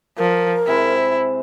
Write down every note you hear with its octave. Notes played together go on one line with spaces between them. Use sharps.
F3 A#4
C3 G#3 C4 E4